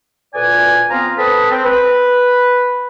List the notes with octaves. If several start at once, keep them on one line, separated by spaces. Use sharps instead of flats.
D2 A#2 B4 D5 G#5
F3 B3 C4 F4 F5 A#5
C4 A4 B4 A5 B5 D#6
C4
B4